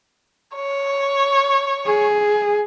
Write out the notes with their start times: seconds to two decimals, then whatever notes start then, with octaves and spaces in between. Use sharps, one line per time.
0.55 C#5
1.86 G#4